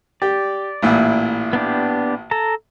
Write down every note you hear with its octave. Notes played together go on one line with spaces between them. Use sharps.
G4 D5
A1 A#2 E4
B3 D4 G4
A4 A5 A#5